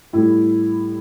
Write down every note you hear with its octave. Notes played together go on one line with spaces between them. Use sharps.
A2 G3 E4